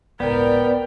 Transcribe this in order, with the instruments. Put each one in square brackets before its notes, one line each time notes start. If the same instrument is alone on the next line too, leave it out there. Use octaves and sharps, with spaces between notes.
[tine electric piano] G1 C#2 A2 [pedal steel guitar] B3 [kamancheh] A#4 G5 [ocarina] D5